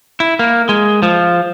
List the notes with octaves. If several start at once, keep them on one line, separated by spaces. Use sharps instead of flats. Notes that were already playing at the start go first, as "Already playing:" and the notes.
E4
A#3
G#3
F3